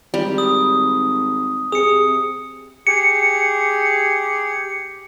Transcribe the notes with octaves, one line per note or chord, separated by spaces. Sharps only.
G#1 G3
D#6
C3 G#4 D#6 C#7
G4 G#4 C#7